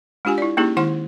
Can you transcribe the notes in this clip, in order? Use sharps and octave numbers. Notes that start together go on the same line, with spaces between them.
G#3 D4 F4 G4 G#5
E4 D5
A#3 C#4 D#4 E4 G4 G#4
D#3 G#3 E4 F#5 C6